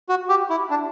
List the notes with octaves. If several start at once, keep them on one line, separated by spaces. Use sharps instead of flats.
F#4
G4
E4
D4